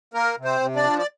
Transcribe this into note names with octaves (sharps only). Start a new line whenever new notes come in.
A#3 A#4
C3
C4 C5
C3
D4 D5
F3
D5